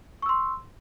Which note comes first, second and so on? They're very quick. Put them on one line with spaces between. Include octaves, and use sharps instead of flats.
C#6 E6 C6